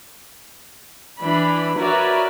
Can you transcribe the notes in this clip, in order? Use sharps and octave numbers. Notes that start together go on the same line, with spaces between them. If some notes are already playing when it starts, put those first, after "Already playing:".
E3 D4 B5
F#4 A#4 B4 C#5 D5 E5